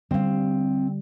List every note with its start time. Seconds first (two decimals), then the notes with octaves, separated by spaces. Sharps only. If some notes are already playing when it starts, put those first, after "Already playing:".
0.11 D3 G3 C4 F5